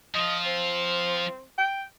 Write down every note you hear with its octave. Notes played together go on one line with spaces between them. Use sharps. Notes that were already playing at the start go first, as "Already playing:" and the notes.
F3 F4 D#5
C4
G5